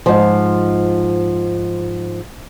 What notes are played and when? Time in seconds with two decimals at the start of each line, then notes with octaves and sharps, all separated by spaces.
0.06 G#2 F3